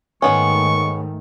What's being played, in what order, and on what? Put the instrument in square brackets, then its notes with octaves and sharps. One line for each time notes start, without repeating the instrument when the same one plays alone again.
[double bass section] G#2 D#3 A3 [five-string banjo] G#3 B3 C#4 [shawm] C#6